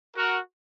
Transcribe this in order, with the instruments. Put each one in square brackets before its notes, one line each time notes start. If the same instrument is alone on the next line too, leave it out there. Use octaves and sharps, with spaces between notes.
[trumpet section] F#4 A#4